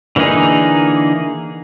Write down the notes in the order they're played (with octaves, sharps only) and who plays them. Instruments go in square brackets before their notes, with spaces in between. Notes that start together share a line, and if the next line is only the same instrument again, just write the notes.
[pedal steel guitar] D3 E3 A#3 D#4 G#4